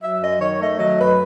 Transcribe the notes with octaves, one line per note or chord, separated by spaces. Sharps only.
F#3 E5
F#2 D#5
D#3 C#5
A3 D#5
F#3 D#5
F#2 B4